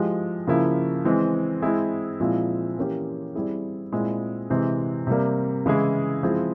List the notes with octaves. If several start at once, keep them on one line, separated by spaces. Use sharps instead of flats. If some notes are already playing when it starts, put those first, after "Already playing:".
Already playing: F3 G#3 E4 G4
C#3 F3 A#3 E4
E3 G#3 C4
G#3 C4 E4 G#4
A#2 F3 G#3 C4 E4
E3 A#3 C#4 G4
G3 C4 E4 G#4
A#2 G#3 C4 E4
C3 E3 G#3 C4
C3 G3 A#3
C#3 E3 G#3 E4 G#4
F3 G#3 C4 E4 G#4